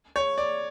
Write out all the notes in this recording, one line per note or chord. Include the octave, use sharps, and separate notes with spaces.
C#5
D5